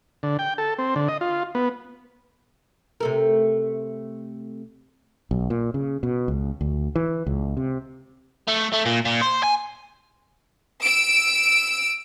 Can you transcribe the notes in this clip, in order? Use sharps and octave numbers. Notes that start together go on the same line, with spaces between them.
D3
G5
A4
C4
D3
D#5
F4
B3
C3 A3 A#4
B1
A#2
C#3
B2
C#2
D2
E3
C#2
C3
A3
A3
A#2
A#2
C5
G#5
E6 D7